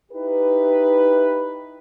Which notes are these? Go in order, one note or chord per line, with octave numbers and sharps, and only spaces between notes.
D#4 E4 G4 B4